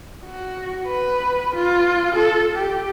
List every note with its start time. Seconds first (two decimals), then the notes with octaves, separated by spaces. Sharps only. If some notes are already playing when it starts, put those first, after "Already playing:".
0.25 F#4
0.86 B4
1.55 F4
2.15 A4
2.56 G4